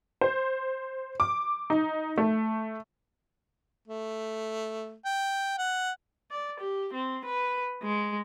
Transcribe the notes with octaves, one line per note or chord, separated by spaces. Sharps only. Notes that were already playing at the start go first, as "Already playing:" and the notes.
C5
D6
D#4
A3
A3
G5
F#5
D5
G4
C4
B4
G#3